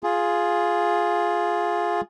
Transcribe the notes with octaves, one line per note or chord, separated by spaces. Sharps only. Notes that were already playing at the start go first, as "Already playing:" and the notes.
F4 G#4